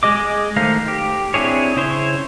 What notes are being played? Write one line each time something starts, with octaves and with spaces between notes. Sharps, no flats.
G#3 G#4 D#5 D6
D#3 A3 C5 F5 A#5
G4
C4 D4 E4 G#4 C#5
C#3 E4 C5 C#5